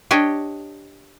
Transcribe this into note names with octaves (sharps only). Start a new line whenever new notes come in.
D4 G4 C#5 D#5